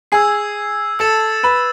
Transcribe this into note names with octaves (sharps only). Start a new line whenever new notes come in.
G#4 G#5 E6 G#6 C7
A4 A5 E6 A6 E7
B4 B5